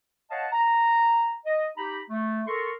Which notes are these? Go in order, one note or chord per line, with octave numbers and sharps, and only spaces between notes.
C#5 D#5 F5 F#5 A5
A#5
D#5
D#4 G4 A#5 B5
A3
A4 A#4 C6 C#6